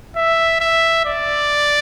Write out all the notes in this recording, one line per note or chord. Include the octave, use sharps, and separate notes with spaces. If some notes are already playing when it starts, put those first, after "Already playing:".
E5
E5
D5